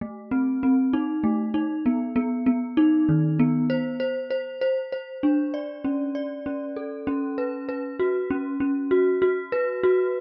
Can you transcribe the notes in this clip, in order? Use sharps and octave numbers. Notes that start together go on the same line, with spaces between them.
A3
C4
C4
D#4
A3
D#4
B3
B3
B3
D#4
D#3
B3
C5
C5
C5
C5
C5
D4
D5
C#4
D5
C#4
A4
C#4
B4
B4
F#4
C#4
C#4
F#4
F#4
B4
F#4